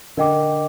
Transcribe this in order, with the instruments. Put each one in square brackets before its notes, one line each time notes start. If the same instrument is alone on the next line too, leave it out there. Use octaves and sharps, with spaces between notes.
[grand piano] D3 [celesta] A#4 D#5 G5 D6